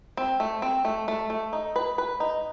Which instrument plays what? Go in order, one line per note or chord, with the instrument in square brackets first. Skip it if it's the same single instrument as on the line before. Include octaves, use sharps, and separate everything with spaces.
[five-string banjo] C4
A3
C4
A3
A3
A3
D#4
B4
B4
D#4